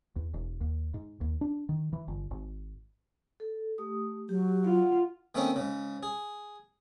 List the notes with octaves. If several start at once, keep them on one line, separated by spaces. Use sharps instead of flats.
E2
E1
D#2
G#2
D#2
D4
D#3
E3
G1
G#1
A4
A3 G4 D#6
F#3 G4
F4 F#5
D#3 A3 A#3 C4 C#4 D#4
G#2 C#3
G#4